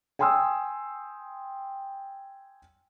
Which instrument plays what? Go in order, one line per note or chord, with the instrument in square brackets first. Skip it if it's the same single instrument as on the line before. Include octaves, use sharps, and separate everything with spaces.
[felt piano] G5 G#5 C6 D#6 E6